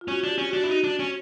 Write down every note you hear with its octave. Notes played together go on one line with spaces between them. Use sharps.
F4
C#4 F#4
D4 G4
C#4
D4 F#4
E4
D#4 F#4
D4
C#4